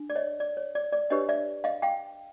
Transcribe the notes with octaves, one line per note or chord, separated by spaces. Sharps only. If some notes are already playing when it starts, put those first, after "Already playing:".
Already playing: D4
D5
C#5 D#5
D5
C#5
D5
D5
D4 G4 B4 C#5 D#5
D5 E5
D#5 F5
F5 G5